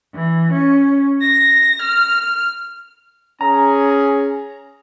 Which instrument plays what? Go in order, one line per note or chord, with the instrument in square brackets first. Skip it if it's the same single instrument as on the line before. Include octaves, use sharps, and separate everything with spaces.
[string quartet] E3
C#4
A#6
F6
[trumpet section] C#4 G#4 [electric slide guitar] A#5